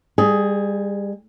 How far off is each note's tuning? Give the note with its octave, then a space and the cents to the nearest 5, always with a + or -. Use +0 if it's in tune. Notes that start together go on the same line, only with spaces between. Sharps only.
G3 +35 G#4 +10